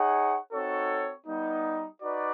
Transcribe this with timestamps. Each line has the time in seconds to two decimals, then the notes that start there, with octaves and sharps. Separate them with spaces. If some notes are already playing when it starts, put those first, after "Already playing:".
Already playing: D#4 G#4 C#5 F#5
0.52 C4 D#4 F#4 A4 C#5
1.27 G3 B3 D#4
2.02 D#4 F#4 B4 D5